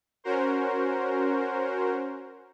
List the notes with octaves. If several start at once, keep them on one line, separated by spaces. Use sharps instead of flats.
C#4 F#4 A#4 C5